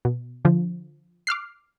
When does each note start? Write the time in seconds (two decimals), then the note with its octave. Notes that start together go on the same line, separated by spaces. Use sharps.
0.05 B2
0.45 D3 F3
1.27 D6 F6 F#6 C7